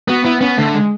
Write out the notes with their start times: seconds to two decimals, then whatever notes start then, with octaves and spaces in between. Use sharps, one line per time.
0.08 B3 F#4
0.25 B3 E4
0.41 B3 C#4
0.58 D3 A3
0.74 G#3